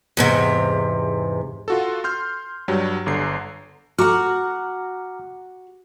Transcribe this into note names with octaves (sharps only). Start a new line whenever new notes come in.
E2 G#2 C3
F4 F#4 A4
C6 F6 G6
G2 F#3 G3
G1 D3 A#5 C7
F#4 F#5 A#5 D6 F6